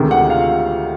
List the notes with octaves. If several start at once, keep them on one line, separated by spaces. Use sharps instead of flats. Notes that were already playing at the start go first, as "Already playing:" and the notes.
Already playing: D2 C3 D#3 G#3
F#5
F5